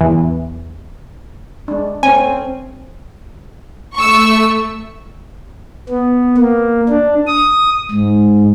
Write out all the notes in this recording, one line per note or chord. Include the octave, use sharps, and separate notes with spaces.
E2
G#3 D4
A3 C4 C#4 G#5
A3 C#6 E6
B3
A#3
D4
D#6
G#2